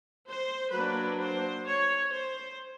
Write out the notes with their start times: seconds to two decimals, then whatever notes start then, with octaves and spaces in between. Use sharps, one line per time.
0.27 C5
0.73 F#3 A#3 D4 B4
1.19 C5
1.66 C#5
2.12 C5